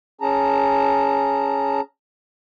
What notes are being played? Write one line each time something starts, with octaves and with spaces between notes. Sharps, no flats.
C#4 G#4 A5 A#5